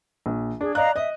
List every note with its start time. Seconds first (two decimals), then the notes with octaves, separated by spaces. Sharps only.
0.26 A#1
0.61 D4 G#4
0.75 D5 D#5 F5 A#5 F#6
0.96 D#5 E5 D#6